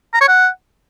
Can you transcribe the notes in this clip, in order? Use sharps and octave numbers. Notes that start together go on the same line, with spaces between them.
A#5
C#5
F#5